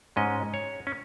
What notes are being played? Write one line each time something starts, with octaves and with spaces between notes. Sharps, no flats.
G#2 G#3 C#4 D#5
C#5
C#4